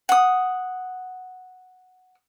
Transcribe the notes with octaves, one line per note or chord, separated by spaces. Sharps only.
F#5 D#6